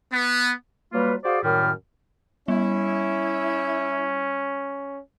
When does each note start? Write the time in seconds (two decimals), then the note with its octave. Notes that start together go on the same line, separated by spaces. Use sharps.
0.13 B3
0.93 F#3 G3 A#3 F4 B4
1.24 F#4 G#4 C5 D5 F5
1.43 F#2 A2 D#3 G3 F6
2.48 G3 C#4 E4